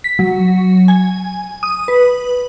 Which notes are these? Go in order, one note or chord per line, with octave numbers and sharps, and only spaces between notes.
B6
F#3
G#5
D#6
B4